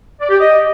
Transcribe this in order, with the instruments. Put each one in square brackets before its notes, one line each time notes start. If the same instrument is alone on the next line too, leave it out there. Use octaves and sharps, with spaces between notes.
[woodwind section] D5
G4
D#5